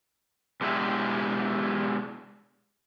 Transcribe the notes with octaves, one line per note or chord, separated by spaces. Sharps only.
B2 G#3 D4 E4 G4